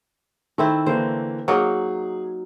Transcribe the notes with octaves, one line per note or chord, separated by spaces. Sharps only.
D#3 A3 C4 E4
D3 E3 A#3 C5
F#3 A#3 D#4 G#4